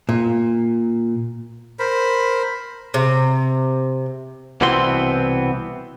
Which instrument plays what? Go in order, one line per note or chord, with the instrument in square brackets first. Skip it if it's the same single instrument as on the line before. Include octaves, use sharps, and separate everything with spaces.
[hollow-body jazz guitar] A#2
[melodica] A#4 C5 B5
[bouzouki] C3
[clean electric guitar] C2 B2 E3 B3 C4 C6